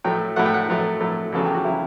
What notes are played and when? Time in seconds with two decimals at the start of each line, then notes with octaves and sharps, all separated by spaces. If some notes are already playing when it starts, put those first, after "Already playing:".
0.04 A2 F#3 A3 G5
0.36 A2 F#3 A3 F#5
0.46 G5
0.54 F#5
0.69 A2 F#3 A3
1.00 A2 F#3 A3
1.32 E2 C#3 F#3 A4
1.46 G4
1.54 F#4
1.65 C#3 F#3 E4